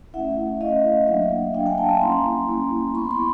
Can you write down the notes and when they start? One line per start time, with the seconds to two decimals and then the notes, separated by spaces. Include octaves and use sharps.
0.14 A3 C#4 E4 E5 F#5
0.60 A3 C#4 E4 D#5 F5
1.08 F#3 A#3 D4 E5 F#5
1.54 F#3 A#3 D4 F5 G5
1.66 F#5 G#5
1.78 G5 A5
1.89 G#5 A#5
2.01 G3 A#3 C#4 E4 A#5 C6
2.48 G3 A#3 C#4 E4
2.95 B3 E4 B5 C#6
3.05 C6
3.11 B5 C#6